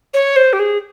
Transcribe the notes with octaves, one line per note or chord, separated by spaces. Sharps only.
C#5
C5
G4
G#4